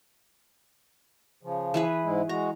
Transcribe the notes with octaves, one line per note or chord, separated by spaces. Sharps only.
C#3 F3
E3 G#4 B4
G#2 G#3 E4
G#3 F#4 A#5